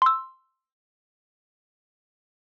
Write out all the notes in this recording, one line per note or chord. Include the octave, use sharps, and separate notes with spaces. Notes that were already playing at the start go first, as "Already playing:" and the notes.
C6 E6